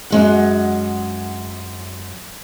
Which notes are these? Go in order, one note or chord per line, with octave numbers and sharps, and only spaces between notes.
F#2 G#3 F#5